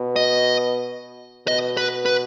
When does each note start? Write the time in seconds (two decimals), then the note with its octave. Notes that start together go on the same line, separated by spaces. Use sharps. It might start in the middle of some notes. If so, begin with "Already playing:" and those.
Already playing: B2
0.16 D#5
1.47 B2 D#5
1.77 B4
2.06 B4